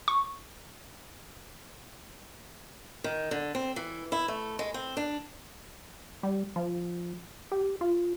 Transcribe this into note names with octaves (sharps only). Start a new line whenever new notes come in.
C#6
D#3
D3
C4
E3
E4
A3
G#3
C4
D4
G3
F3
G4
F4